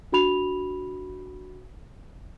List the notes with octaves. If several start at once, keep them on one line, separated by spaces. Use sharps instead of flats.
D4 F#4 B5 F7